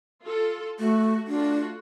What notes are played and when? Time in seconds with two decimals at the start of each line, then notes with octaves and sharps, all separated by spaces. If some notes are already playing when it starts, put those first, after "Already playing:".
0.22 F4 A4
0.79 A3 F#4
1.28 A3 D4 F4 F#4